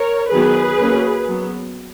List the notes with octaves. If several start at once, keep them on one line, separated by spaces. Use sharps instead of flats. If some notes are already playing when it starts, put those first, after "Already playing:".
Already playing: A#4 C#5
D#3 F#3 B3 G#4 B4
F#3 A#3 C#4
F#3 B3